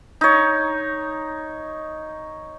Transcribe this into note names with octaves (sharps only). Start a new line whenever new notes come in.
D#4 C#5